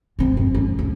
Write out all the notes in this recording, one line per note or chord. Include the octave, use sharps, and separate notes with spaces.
G1 C4
F2
C#4
D3